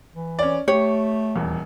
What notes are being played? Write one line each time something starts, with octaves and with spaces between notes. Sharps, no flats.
E3
C#4 D5
A3 G4 C#5
D#1 E2